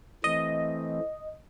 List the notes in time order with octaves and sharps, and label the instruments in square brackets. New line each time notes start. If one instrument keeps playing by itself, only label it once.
[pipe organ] E3 A3 C4 [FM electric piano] D#5